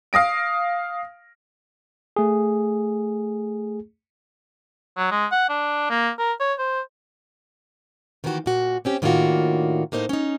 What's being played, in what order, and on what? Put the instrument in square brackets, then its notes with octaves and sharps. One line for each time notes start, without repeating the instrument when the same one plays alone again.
[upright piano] F5 D#6 A#6 D7
[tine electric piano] A3 G#4
[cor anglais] F#3
G#3
F#5
D4
A#3
A#4
C#5
C5
[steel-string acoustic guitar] D#3 E3 A#3 B3 F#4 G4
A#2 F#4
C4 C#4 G4
A2 D#3 A#3 D4 F4 F#4
A2 A#3 D#4 C5 D#5
C#4 D#4